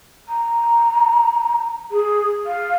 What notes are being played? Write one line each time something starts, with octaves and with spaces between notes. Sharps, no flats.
A#5
G#4
F5